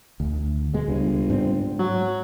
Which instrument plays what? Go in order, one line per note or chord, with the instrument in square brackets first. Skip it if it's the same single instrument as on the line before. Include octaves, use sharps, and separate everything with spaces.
[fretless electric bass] D2
B2 G#3
[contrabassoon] G1 [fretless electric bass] C#2
[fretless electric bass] G#2 C4 D4
[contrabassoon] F#3